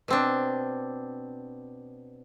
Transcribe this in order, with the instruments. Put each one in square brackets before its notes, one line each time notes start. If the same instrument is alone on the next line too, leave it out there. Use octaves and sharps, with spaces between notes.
[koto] B2 C4 D4